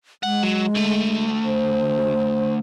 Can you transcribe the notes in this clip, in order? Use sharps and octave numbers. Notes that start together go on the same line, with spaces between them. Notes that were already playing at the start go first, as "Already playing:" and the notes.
G#3 F#5
F#3
D2 A3
C5